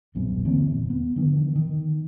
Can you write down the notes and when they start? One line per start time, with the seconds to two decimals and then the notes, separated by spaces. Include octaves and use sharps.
0.15 D#1 B1 F#2 B3
0.45 D3 E3 A#3 C4
0.70 D#1
0.90 B3
1.16 D3 D#3 F3
1.56 D#3